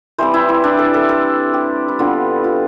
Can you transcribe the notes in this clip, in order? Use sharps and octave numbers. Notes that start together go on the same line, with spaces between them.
E3 G3 C4 C5
E4
E4
D4
A4
A4
A4
G4
E4
D3 G3 B3 F4
F4